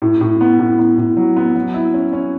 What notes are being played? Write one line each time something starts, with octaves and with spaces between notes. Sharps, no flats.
A2
A2
B3
A2
B3
A2
F#3
B3
F#3
E4
C#4
C#4